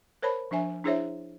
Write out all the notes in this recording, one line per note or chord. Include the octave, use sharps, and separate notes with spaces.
A#4 C5 C#5 A5 B5
F3 D4 E5 G#5
D4 E4 G#4 C5 C#5 E5